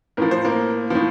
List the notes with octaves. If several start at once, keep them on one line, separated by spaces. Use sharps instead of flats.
A2 F3 A#4
C5
A#3 A#4
A2 F3